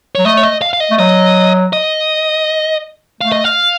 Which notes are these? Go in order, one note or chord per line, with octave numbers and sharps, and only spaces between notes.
F#3 C#5
A3 D#5
C#5
D#5
F5
F5
D#5
A3
F#3 D#5
D#5
A3 F5
D#5
F5